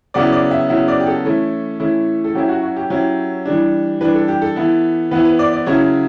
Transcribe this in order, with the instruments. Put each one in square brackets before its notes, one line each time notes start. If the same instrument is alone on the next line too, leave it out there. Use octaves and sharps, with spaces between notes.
[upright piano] C#3 F#3 B3 E4 D5
D5
E5
C#3 F#3 B3 E4 E5
D5
G4
A4
E3 A3 C#4 E4
E3 A3 C#4 E4
A4
F#3 C#4 E4 G4
F#4
F#4
G4
F#3 C#4 E4 G4
E3 G3 D4
E3 G3 D4 B4
A4
G4
A4
E3 B3 E4
E3 B3 E4 B4
B4
D5
D5
C#3 F#3 C#4 E4 C#5